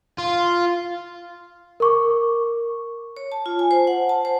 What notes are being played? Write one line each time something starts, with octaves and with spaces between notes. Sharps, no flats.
F4
A#4 C#6 D6
C#5
A5
F4
G#5
C5
F#5
A5
C5